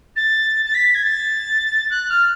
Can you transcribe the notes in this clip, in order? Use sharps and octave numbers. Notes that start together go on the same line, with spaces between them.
A6
A6
B6
G#6
A6
F#6
F6